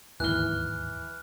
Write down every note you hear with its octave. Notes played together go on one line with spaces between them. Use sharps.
D1 D#2 G#2 E3 F6 F#6 G7